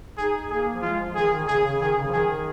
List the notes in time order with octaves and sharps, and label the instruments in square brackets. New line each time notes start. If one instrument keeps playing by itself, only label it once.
[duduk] D#4 [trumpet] G#4
[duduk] A#3 [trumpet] G#4
[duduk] F3
[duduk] G#3 [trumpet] F4
[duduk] F3
[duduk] D#3 [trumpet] G#4
[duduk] D#3
[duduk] C#3 [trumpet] G#4
[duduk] C#3
[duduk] D#3 [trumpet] G#4
[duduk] C#3
F3
[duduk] D#3 [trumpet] G#4